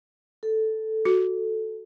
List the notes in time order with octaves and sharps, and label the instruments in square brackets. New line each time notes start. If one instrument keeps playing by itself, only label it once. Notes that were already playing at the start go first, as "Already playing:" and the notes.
[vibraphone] A4
[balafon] F#4